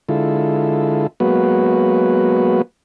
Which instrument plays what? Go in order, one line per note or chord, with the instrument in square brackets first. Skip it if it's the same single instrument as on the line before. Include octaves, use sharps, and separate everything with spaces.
[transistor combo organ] D3 G#3 E4 F4 A4
F#3 G#3 A#3 B3 F#4 B4